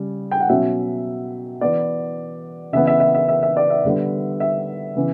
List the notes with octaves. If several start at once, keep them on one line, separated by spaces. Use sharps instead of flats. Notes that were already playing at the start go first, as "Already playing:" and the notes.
Already playing: C#3 G3
G5
F#5
B2 F#3 C#4 E5
E3 B3 D5
C#3 E3 B3 E5
E5
E5
E5
E5
E5
D5
E5
D3 G3 B3
E5
C#3 E3 B3